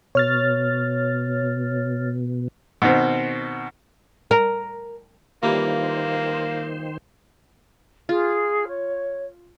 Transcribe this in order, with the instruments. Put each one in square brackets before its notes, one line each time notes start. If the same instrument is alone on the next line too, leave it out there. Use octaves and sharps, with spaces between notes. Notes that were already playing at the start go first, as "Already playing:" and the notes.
[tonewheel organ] B2 [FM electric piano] C#5 F6 A6
[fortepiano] B2 D#3 C4
[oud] A#4
[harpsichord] A#2 E3 G3 [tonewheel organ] D#3 C5 [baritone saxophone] A#3
[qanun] F4 [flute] G#4
[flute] C#5